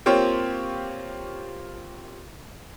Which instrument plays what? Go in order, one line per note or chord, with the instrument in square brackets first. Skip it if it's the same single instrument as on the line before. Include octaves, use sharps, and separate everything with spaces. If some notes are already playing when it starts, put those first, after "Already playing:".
[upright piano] A#3 C4 F4 G4 C#5